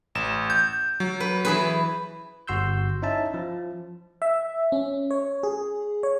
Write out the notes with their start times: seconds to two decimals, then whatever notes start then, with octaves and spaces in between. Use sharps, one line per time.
0.15 A1 E7
0.50 G6
1.00 F#3
1.20 B4
1.45 E3 G#4 B4
2.47 G1 F#4 C6 E6 G6
3.02 C#4 D#4 E4 E5 A5
3.34 F3
4.22 E5
4.72 C#4
5.11 C#5
5.43 G#4
6.03 C#5